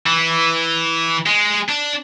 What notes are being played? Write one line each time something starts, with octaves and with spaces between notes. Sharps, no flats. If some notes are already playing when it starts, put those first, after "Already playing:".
E3
G#3
D4